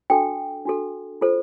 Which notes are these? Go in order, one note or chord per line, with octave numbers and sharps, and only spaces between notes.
D4 F#4 A4 G5
D4 F#4 A4
F4 A4 C5